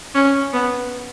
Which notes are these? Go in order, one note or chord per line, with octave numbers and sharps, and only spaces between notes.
C#4
B3